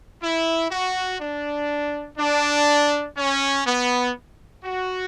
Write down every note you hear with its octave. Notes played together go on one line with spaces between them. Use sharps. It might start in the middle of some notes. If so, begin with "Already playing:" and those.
E4
F#4
D4
D4
C#4
B3
F#4